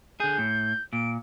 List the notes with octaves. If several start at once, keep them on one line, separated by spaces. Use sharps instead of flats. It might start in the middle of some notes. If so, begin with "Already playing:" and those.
D3 G#4 G6
A2
A#2 D7